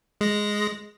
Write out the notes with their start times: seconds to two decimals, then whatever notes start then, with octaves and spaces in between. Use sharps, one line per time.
0.21 G#3 A#6